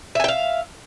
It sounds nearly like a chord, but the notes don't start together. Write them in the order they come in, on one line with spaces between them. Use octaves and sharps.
E5 G#5 G5 F5